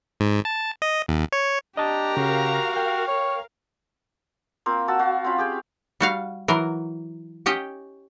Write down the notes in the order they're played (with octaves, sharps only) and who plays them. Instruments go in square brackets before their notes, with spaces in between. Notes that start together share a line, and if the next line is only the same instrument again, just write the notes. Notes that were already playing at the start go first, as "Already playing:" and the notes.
[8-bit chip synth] G#2
A5
D#5
D#2
C#5
[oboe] D4 [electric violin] G4 A#5 [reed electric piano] D#5 A5
[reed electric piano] C#3 [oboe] F#4 [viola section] A#4 F5
[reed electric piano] G5
[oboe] C#5
[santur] A#3 C4 F4
F#4 F#5 A5 E6
F#4 F5
C4 C#4 F4 B5
G4 G#4 G5
[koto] G3 F#4 F5
E3 F#3 A#4
C#4 G4 D#5 G5